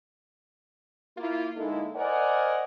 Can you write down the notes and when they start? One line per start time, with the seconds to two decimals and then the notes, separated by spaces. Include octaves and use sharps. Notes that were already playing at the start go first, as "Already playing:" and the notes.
1.18 A#3 E4 F4
1.57 D3 G#3 A#3 D#4 E4 A4
1.96 A#4 C5 D5 D#5 F#5 G#5